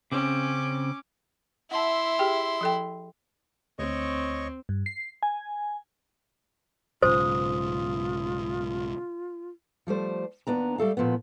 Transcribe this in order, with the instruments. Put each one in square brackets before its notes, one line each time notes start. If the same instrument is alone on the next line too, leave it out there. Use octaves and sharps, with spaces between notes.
[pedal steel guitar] C#3 C4 [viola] C#4 D6
[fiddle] E4 C6 [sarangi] E5 [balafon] F#5 A5
[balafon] G4 G#4 G5
F3 A4 G5
[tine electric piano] D2 [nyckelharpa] C4 [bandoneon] C#5 D#5 C#6
[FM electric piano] G2
C7
G#5
[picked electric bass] B1 G#2 C#3 [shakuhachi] F4 [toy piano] C5 [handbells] D#6
[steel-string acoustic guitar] F3 G3 A3 C5
D#2 B3 D4 A#5
G3 A3 A4 F5
A#2 F3 A3 B3